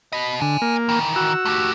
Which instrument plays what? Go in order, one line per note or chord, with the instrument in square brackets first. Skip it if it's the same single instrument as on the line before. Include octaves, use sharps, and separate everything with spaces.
[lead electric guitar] B2 D#5 [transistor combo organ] B5
[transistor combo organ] D3 [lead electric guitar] D#5 G#5
[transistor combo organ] A#3
[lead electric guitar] D#3 E3
[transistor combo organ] F#4 E6
[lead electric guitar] A3 G4